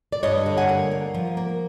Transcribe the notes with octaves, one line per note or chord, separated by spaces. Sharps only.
D5
G2 C#5 D#5
D3
F#5 G#5
A#3
A#3
F3
A#3